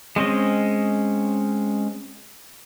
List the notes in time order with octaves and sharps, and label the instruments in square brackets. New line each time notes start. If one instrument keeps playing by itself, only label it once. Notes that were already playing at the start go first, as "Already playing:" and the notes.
[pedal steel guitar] G#3 C4 C#4 D#5